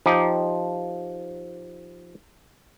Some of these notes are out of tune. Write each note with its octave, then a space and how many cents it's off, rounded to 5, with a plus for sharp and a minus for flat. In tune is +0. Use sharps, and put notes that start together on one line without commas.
F3 +0 D#4 +0 G4 +0